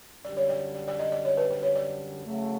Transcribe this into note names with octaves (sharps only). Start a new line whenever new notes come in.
F#2 D3 G3 D5
C#5
D5
D5
D5
D#5
D5
C#5
B4
C5
C#5
D5
C#3 F#3 A3